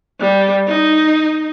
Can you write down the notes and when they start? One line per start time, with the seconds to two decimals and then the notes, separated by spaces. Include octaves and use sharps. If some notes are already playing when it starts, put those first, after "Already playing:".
0.20 G3
0.68 D#4